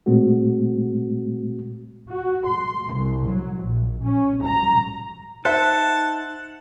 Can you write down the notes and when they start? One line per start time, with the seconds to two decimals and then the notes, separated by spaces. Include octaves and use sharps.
0.06 A#2 G#3 A3 C4 F#4
2.10 F#4
2.47 C6
2.96 C2
3.28 F#3
3.64 A#1
4.03 C#4
4.44 A#5
5.45 D#4 C5 E5 F#5 A5